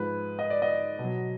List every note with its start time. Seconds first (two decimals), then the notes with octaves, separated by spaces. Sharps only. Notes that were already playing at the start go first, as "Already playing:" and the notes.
Already playing: G#2 F3 G#3 B4
0.39 D#5
0.50 D5
0.62 D#5
0.99 B2 F#3